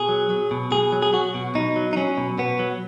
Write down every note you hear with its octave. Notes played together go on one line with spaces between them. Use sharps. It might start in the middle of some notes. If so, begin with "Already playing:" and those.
Already playing: B2 G#4
F#3
F#3
B2
B2 G#4
F#3
G#4
F#3 F#4
B2
B2 D#4
F#3
D#4
F#3 C#4
B2
B2 B3
F#3